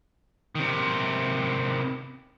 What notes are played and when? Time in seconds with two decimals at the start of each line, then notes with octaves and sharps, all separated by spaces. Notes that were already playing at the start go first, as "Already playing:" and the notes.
0.55 C3 D#3